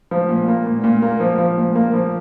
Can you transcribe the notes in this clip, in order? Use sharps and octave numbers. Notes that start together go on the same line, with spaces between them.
F3
A#2
A#3
A#2
A#2
A#3
F3
F3
A#2
A#3
F3